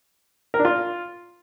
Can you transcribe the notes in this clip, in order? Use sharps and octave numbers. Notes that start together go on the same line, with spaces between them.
A#4
D4
F4